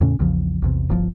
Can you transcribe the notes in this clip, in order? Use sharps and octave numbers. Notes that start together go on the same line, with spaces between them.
E2 A2 C#3 C#4
A#1 E2 C#3 F3
A#1 E2 C3
D1 G1 E3 F3